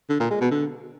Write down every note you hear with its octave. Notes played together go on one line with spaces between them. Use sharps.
D3
A#2
G#3
B2
D3